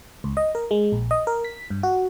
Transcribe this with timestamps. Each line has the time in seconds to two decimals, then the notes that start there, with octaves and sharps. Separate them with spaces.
0.24 C#2
0.37 D#5
0.55 A#4
0.71 G#3
0.92 A#1
1.11 D#5
1.27 A#4
1.45 B6
1.70 G2
1.83 F#4